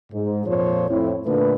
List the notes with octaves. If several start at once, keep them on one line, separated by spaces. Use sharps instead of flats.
G#2
F2 A#2 F3 C5 C#5
F2 A2 C4 E4
A#2 D3 A3 B4